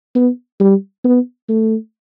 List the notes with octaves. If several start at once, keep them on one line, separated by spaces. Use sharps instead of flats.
B3
G3
B3
A3